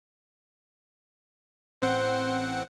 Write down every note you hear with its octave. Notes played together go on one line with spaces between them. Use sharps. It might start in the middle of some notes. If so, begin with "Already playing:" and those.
A1 C4 C5 F#5